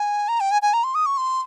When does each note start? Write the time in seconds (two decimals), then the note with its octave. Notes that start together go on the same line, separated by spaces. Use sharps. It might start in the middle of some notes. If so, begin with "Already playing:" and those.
Already playing: G#5
0.28 A#5
0.40 G5
0.51 G#5
0.62 G#5
0.73 A#5
0.84 C6
0.95 D#6
1.06 C#6
1.17 C6